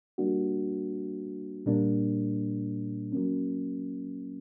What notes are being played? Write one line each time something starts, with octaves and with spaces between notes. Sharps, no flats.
G3 A#3 D4 F#4
A#2 G3 A#3 D4
F#3 A#3 C#4